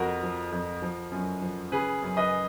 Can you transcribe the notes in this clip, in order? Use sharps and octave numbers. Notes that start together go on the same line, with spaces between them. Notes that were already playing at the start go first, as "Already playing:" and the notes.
Already playing: F2 F#4 A#4
F3
F2
F3
F#2
F3
C#3 G#4 B4
F#2
B4 D#5